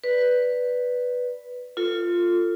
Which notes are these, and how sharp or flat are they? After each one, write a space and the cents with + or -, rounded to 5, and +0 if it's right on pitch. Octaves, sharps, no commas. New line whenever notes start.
B4 +0 D5 +0
F4 +0 A4 +35